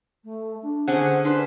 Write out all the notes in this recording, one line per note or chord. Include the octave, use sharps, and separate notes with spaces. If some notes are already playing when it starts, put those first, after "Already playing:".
A3
D4
D3 C#4 G#4 C5 F#5
D4 B4 C5 D5 C6